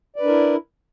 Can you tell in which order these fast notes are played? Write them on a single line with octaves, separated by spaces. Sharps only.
D5 B4 D4 A#4 E4